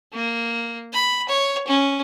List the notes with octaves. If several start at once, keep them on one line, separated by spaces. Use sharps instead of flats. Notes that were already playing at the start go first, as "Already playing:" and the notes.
A#3
B5
C#5
C#4